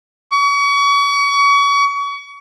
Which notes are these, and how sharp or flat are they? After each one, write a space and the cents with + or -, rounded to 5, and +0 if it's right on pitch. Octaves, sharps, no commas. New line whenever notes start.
C#6 +35